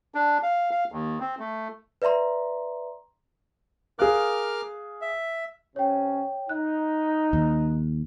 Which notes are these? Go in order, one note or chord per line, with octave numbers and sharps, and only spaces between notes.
D4
F5
F5
D#2
C4
A3
B4 D5 E5 A#5 C6
G#4 A#4 F5 D6 F6 F#6
E5
C3 C#4 C#5 G5
D#4 F#6
D#2